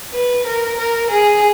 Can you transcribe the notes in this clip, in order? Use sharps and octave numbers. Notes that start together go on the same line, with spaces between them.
B4
A#4
A#4
G#4